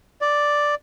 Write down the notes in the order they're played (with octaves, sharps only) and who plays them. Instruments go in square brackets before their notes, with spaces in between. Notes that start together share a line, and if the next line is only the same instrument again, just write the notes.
[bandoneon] D5